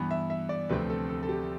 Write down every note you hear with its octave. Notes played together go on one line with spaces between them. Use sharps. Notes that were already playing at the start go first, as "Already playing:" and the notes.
Already playing: G2 E3 B3
E5
E5
D5
D2 C3 F3 A3 C4 B4
A4
A4
A4
G4